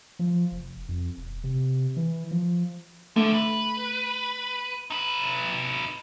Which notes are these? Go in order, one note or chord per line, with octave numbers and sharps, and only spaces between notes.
F3
F1
F2
E1
C3
E3
F3
F2 D3 A3
B4
D#4 B4